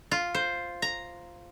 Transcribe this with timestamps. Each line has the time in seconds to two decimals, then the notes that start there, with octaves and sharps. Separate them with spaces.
0.11 F4
0.35 C5
0.82 A#5